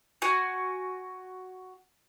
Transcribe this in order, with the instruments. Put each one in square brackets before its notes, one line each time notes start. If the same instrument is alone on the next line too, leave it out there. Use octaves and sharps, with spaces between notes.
[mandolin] F#4 G#5